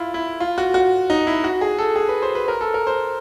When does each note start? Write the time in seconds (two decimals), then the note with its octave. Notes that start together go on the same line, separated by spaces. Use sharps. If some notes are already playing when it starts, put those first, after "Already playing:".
Already playing: E4 F4
0.14 E4
0.40 F4
0.58 F#4
0.74 F#4
1.10 D#4
1.27 E4
1.44 F#4
1.61 G#4
1.78 A4
1.96 G#4
2.09 B4
2.22 C5
2.35 B4
2.48 A#4
2.61 A4
2.74 A#4
2.87 C5